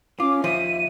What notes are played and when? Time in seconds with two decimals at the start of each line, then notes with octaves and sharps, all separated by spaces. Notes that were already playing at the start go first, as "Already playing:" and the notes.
0.20 C#4 F4 D6
0.44 D#2 F3 E5 D#7